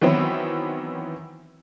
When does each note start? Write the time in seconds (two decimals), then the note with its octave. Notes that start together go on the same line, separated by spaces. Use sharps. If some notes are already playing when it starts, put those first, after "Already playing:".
0.01 D#3 E3 F#3 B3 C4 E4